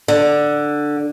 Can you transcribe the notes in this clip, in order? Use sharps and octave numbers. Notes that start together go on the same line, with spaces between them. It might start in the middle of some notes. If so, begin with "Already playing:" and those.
D3